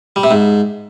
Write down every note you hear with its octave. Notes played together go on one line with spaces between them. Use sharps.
G3
C3
G#2